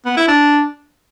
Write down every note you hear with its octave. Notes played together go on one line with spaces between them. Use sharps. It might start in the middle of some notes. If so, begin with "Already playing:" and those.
B3
E4
D4